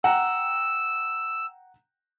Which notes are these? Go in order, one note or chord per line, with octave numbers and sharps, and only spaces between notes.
F#5 G5 A#5 E6